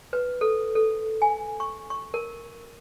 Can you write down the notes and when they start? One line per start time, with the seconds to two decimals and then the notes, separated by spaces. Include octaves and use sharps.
0.13 B4
0.41 A4
0.75 A4
1.22 G#5
1.60 C#6
1.90 C#6
2.14 A#4